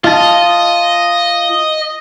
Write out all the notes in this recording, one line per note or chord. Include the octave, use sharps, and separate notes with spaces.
F4 D#5 A5